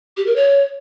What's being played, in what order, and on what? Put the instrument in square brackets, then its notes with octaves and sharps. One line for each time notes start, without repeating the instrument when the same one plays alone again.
[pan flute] G4
A#4
C#5